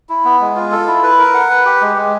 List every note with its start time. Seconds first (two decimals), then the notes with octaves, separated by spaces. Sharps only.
0.09 E4
0.25 B3
0.41 G#3
0.56 F4
0.72 A4
0.87 E4
1.03 B4
1.19 A#4
1.34 F#5
1.50 B4
1.66 G4
1.81 G#3
1.97 G#3